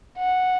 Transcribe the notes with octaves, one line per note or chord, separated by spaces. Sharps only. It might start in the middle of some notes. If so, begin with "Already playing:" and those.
F#5